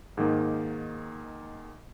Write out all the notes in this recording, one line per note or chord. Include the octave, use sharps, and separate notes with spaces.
G#2 D#3 A#3 D#4